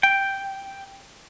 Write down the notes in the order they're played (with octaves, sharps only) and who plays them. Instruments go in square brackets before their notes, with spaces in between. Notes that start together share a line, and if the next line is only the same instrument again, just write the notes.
[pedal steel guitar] G5